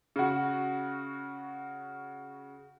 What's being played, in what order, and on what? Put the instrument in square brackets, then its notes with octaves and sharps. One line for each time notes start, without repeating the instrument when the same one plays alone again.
[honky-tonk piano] C#3 F#4